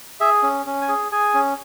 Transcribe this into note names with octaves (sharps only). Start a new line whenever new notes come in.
G#4 E5
C#4
C#4
G#5
G#4
G#4 G#5
C#4